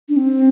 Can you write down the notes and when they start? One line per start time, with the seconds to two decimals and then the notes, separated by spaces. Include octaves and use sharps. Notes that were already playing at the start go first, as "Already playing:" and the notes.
0.09 D4
0.17 C4